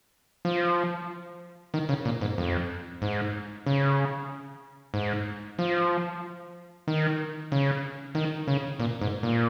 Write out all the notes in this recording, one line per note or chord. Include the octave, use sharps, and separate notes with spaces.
F3
D#3
C#3
A#2
G#2
F2
G#2
C#3
G#2
F3
D#3
C#3
D#3
C#3
A#2
G#2
A#2